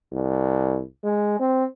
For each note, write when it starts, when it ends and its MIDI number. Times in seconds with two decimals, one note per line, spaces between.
0.12 0.82 36
1.04 1.34 56
1.39 1.64 60